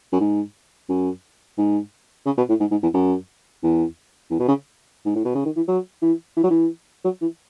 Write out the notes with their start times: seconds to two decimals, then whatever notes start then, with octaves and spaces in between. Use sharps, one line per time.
0.13 F#2
0.20 G#2
0.89 F#2
1.58 G#2
2.26 C#3
2.38 B2
2.49 A2
2.60 G#2
2.71 G#2
2.83 E2
2.94 F#2
3.63 E2
4.31 E2
4.40 B2
4.48 C#3
5.05 G#2
5.15 A2
5.25 B2
5.35 C#3
5.45 D#3
5.56 E3
5.68 F#3
6.02 E3
6.36 E3
6.43 F#3
6.50 E3
7.04 F#3
7.21 E3